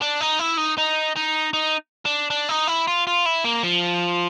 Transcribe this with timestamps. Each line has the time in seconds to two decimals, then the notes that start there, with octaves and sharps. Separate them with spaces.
0.01 D4
0.21 D#4
0.39 E4
0.58 D#4
0.78 D#4
1.16 D#4
1.53 D#4
2.05 D4
2.30 D4
2.49 D#4
2.68 E4
2.87 F4
3.07 F4
3.26 E4
3.44 A#3
3.63 F3